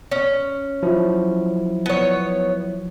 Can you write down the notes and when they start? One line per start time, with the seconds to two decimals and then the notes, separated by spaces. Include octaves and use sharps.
0.11 C#4
0.83 F3 F#3 E4
1.86 B3 C#5